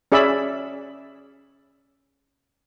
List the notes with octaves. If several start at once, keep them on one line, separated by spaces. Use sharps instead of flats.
C#4 G#4 D5 E5 B5